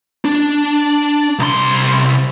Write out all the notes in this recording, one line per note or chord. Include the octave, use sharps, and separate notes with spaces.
D4
C2 C6